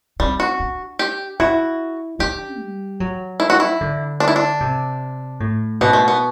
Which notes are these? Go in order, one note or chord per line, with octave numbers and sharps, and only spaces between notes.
G3 C4
F#4
D4
G4
E4 F#4
D4 G4
G3
F#3
E4
F#4
E4
D3
D4
E4
D4
C3
A2
B2 B3
A3
B3